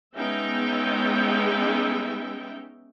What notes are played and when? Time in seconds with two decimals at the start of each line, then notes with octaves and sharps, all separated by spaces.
0.16 G#3 B3 C#4 D#4 E5 G5